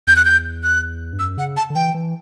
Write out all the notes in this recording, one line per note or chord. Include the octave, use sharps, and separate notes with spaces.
E2 G6
F#6
G6
F#6
G2
F#2 E6
C#3 F#5
A5
D3
E3 G5
E3